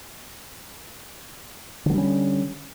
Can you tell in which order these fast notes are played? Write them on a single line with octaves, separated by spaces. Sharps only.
D3 F#3 G3 C#4